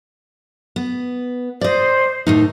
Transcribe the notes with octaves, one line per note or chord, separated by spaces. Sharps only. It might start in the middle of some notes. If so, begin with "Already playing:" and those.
B3
C5 D5 D#5
D#2 A2 D#4